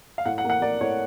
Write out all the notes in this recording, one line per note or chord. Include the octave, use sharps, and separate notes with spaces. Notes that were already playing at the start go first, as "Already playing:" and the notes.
F5
A2 F#5
F#5
A#3
F#5
A#3 D5
A2 C#5